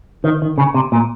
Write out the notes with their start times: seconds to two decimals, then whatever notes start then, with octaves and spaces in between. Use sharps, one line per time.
0.24 D#3
0.42 D#3
0.58 C#3
0.74 C3
0.92 A#2